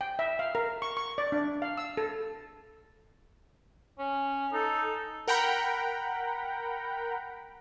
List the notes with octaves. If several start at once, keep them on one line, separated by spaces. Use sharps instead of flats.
G5
E5
F5
A#4
C#6
C#6
D5
D4
F5
E6
A4
C#4
D#4 A4
A#4 F#5 G5 A#5 B5